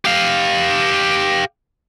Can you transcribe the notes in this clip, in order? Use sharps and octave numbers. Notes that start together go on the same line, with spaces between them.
G4 F5